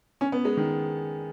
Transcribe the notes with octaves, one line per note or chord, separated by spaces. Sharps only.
C#4
B3
G#3
D#3